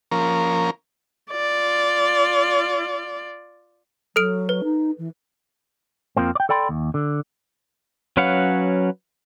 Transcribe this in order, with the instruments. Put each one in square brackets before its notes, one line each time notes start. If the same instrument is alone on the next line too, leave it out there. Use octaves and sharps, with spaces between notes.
[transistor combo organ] F3 A#3 C#4 A#4
[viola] F4 D5
[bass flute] F#3 [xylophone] A4 F6 D7
[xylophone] B4
[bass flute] D#4
E3
[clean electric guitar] F2 F3 A#3 C4
D5 G5
A4 D5 G5 B5 C6
D#2
D3
[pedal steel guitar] F#3 C#4 B4 F5 F#5